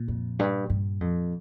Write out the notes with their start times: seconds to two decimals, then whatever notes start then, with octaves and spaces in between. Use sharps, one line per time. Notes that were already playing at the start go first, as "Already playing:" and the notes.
Already playing: A#2
0.08 F2
0.39 G2
0.70 G2
1.01 F2